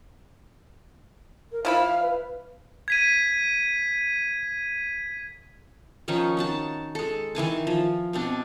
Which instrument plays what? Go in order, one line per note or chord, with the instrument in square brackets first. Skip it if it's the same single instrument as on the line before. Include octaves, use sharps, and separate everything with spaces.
[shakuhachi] A#4
[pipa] F3 E4 B5 [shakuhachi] F5
[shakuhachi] B4
[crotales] G#6 B6 D#7
[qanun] D#3 F3 C#4 D#4
D#4 F#4 A5
G#3 A4
D#3 E3 G#5 A5
F3
B2 C4 D4